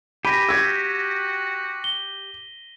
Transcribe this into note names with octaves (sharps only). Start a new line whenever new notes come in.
G4 G#5 B5 A#6 B6 D#7
F#4 E6 G#6
G7